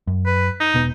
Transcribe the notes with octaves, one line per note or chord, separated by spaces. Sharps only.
F#2
B4
D#4
E1 B2 B3